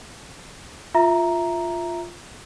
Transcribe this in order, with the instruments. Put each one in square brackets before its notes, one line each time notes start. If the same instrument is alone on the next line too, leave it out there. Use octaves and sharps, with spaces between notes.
[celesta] F4 E5 A#5